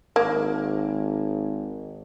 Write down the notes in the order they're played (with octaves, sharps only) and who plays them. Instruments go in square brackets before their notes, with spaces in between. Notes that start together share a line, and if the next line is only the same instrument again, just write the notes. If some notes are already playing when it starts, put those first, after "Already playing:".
[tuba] G#1 [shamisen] A#3